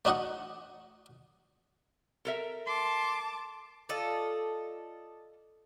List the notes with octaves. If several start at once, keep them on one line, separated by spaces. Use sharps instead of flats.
A3 D4 D#4 F#4 D#5 F#5
A4 A#4 E5
A5 C6 D6
F4 A4 D5 D#5